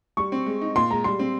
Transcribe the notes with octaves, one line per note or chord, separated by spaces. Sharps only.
G3 C#6
C4
G#3
D#4
A#2 C6
G#3 A#5
G3 C6
C4